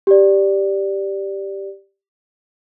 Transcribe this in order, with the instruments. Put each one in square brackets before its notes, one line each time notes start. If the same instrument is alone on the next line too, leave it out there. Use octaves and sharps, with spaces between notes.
[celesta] G4 D5